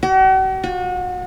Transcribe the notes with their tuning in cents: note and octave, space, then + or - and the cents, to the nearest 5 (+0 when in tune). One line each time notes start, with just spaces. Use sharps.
F#4 +45
F#4 -35